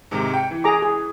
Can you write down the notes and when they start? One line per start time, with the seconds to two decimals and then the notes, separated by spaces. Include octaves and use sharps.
0.11 G#2 C3 D#3
0.33 G5 C#7
0.51 E3
0.64 G#4 A#5 D6
0.82 G#4